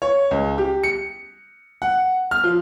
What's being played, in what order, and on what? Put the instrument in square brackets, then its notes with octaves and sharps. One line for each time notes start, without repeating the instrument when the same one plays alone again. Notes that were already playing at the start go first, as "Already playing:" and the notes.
[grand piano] C#5
C#2
G4
C#7
F#5
F6
F3